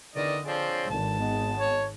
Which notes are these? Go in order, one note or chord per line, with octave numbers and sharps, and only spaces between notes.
E2 D3 D#3 D5 D#5
F3 C4 G#4 C#5 D5
G#1 G#2 D3 D#3 A5
G#3 B3
C#5